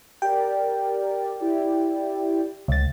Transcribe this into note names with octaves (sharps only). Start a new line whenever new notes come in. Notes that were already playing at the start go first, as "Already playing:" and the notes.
G4 A#4 D5 G5
E4 G4 D5
C#2 A6